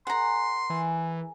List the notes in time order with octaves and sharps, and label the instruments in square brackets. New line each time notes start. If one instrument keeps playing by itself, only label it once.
[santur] G#4 A#4 [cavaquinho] F#5 A#5 [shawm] C6
[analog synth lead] E3 [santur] G#5